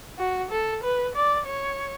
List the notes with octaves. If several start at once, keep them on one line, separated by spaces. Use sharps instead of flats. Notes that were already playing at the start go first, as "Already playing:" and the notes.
F#4
A4
B4
D5
C#5